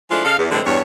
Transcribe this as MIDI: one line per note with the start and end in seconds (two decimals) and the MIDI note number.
0.10 0.23 53
0.10 0.23 56
0.10 0.23 57
0.10 0.23 62
0.10 0.23 64
0.10 0.23 65
0.24 0.36 49
0.24 0.36 69
0.24 0.36 75
0.24 0.36 77
0.37 0.48 40
0.51 0.59 45
0.51 0.59 50
0.51 0.59 52
0.51 0.59 55
0.51 0.59 56
0.51 0.59 60
0.65 0.81 40
0.65 0.81 43
0.65 0.81 62
0.65 0.81 73